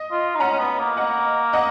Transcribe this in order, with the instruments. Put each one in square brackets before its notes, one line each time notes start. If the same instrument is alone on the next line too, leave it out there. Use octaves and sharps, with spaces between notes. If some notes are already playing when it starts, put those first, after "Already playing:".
Already playing: [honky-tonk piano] D#5
[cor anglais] F4
D#4
[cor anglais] C#4 [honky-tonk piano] F#5 A#5
[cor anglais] C#4
B3
A#3
[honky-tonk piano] D#5 F#5
D#5 F#5